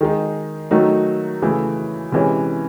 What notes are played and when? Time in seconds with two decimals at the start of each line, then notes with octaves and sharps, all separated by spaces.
0.01 D#3 G#3 D#4
0.71 D#3 F#3 A3 D#4 F#4
1.42 C#3 E3 A3
2.12 C3 E3 G#3 C#4